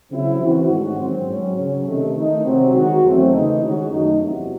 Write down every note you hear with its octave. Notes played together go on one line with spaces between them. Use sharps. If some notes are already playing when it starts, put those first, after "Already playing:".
C#3 F#3 C4 E4
E3 C4 F#4
G#2 D#3 A3 C#4 F#4
G#2 D#3 F#3 C4
G#2 F#3 C#4
C#3 F#3 C#4
C3 D#3 A3
D#3 A3 D#4
C3 F#3 C4
D#3 G#3 D#4 F#4
E2 D#3 F#3 A3 C4
C#3 E3 A3 D#4
D#3 G#3 C#4 F#4
F#2 D#3 A3 D#4
E2 C3 F#3